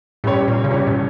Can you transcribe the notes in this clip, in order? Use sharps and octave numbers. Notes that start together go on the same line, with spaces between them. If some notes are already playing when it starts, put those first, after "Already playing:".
A2 G3 C#4 G4 C#5
A#2
C#3
A#2 G3 C#4 G4 C#5
A2